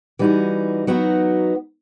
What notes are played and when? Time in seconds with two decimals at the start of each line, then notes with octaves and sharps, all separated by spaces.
0.19 E3 G3 D#4 F#4
0.87 F#3 B3 D#4 F#4